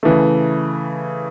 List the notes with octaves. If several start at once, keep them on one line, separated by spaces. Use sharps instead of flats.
C#3 E3 A3